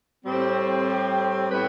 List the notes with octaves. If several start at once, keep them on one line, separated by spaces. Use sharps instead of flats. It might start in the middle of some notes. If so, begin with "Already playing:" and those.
A2 G3 C4
G4
A2 G3 B3 E4 B4